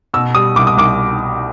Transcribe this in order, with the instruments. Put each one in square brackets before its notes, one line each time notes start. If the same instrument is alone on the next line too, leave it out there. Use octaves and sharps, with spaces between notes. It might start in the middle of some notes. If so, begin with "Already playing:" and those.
[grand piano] B2 E6
G3 D#6
C2 D6
D#6
C2 D6